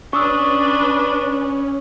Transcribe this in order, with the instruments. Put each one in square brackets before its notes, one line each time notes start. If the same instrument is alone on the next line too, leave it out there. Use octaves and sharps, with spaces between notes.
[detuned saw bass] C#4 [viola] D4 B4 [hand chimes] C#6 D#6 E6